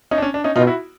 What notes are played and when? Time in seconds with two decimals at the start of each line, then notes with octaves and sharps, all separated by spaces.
0.11 C#4 D#4
0.18 D4
0.22 C#4
0.34 D4
0.44 C#4 D#4
0.56 B2 D#4 F4
0.67 E4 F#4